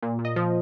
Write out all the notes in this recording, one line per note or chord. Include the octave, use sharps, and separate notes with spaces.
A#2
A#2
D#5
F3